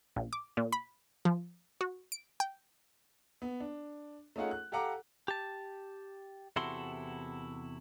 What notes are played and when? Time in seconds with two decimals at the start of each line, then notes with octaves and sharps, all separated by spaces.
0.16 A#1
0.33 D6
0.57 A#2
0.72 B5
1.25 F3
1.81 F#4
2.12 D7
2.40 G5
3.42 B3
3.60 D4
4.36 A3 C#4 D#4 F4 G#4 F#5
4.51 F#6
4.72 G4 A4 F5 F#5 A#5 D6
5.28 G4 A5
6.56 E2 C3 E4 F#4 A4 C6